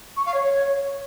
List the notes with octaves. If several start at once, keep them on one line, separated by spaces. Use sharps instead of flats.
C#6
F5
C#5